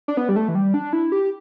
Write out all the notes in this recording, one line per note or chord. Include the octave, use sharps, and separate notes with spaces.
D4
B3
G3
A3
E3
G3
D4
E4
G4